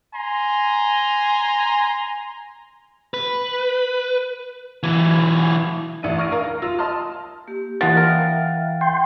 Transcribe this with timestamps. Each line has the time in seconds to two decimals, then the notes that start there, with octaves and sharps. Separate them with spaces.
0.14 G#5 A#5 C6
3.14 B4
4.83 E3 F#3
6.03 A1 D4 E5 D#7
6.18 C#6 F6 A#6 D7 D#7
6.32 A#4 F5
6.44 A#6
6.62 F4 E6 A#6
6.79 D#5 A5 C6 F6
7.48 A#3 G4
7.81 E3 F3 B3 A#4 D5 E5 F#5 A6
7.97 A#4 E5 F5 G5
8.81 G5 C6